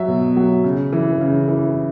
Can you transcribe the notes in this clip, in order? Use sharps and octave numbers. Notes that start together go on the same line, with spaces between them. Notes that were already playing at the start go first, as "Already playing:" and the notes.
Already playing: F#3 E5
B2
F#3
C#3
E3
C#3
E3